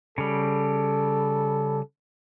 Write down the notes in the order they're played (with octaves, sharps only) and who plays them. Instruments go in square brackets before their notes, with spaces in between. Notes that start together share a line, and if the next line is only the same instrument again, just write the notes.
[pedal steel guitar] C#3 G3 [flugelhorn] A4